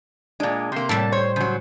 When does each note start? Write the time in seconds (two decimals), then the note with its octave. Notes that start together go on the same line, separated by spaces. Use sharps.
0.40 A#2 G#3 D4
0.72 C3 A#3 C6
0.89 A2 G3 A5
1.12 C5 C#5
1.36 C#3 F#3